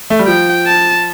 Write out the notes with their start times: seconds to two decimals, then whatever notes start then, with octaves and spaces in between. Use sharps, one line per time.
0.10 A3
0.19 G3
0.27 F3 G5
0.67 A5